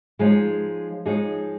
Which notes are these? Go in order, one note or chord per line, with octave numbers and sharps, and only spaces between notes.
F3 G#3 D#4 G#4 C#5
F3 G#3 D#4 G#4 C#5